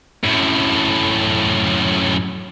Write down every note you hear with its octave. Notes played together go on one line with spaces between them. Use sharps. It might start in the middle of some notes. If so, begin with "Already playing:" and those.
F#2 A2